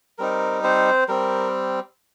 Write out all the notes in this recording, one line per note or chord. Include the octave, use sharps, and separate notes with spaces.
G3 C4 D#4 A#4
C4 C5
G3 C4 A#4